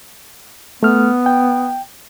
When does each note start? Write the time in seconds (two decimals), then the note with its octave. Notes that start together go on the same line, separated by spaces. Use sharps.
0.83 A3 B3 F6
1.26 G5